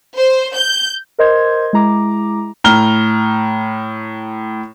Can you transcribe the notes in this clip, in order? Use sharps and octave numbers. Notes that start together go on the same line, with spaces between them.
C5
G6
A#4 C5 D#5 C6 G6 G#6
G#3 E4 A#5 D6
A2 A#5 F6 G7